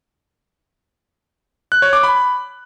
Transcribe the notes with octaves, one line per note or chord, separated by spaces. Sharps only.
F#6
C#5
D6
B5